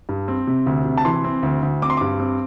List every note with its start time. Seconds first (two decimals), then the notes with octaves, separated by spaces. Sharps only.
0.09 G2
0.28 C4
0.47 C3
0.66 D2
0.85 C3
0.97 A5
1.05 E3 C6
1.24 C4
1.43 D2
1.62 D2
1.82 C4 D6
1.90 C6
1.97 G2 D6
2.20 C4